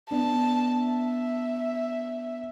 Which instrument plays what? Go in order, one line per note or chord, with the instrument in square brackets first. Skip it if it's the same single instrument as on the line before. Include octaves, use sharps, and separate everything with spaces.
[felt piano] B3 D4 [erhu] A5
[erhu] E5